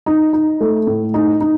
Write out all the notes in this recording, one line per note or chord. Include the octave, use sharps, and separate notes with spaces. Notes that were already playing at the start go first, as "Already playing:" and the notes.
D#4
D#4
A3
A2
D#4
D#4